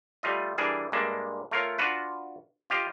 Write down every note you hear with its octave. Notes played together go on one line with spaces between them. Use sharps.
G3 A3 F4 D#5
E3 G3 D4 G#4 A#4
G2 G#3 A#3 D4 E5
A3 F4 A#4 C#5 F5
D4 F4 F#4 B4
F4 G4 D#5 F5